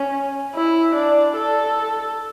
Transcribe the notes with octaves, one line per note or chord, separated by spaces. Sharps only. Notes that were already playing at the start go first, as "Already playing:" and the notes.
Already playing: C#4
E4
D4
A4